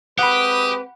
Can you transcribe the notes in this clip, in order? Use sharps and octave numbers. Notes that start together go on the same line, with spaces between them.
G#3 C4 G4 B4 F#5 B5 D#6